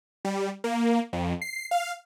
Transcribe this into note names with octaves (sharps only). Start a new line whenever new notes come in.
G3
A#3
F2
C7
F5